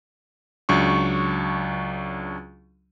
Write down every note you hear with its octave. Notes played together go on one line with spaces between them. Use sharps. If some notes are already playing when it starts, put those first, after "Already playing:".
C#2 F#3 D4 C#6